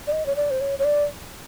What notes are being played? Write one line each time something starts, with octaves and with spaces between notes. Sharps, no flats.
D5
D#5
C#5
D5
C5
C#5
C#5
D5